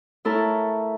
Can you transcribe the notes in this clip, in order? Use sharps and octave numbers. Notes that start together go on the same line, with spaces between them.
A3 E4 A4 A#4 C#5